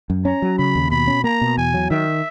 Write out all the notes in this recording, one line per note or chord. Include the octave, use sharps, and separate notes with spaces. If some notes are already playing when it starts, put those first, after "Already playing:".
F#2
C#4 A#5
F#3
C#3 B5
D#2
B2 B5
C#4
A#3 A#5
B2
E2 G#5
F#3
D#3 E5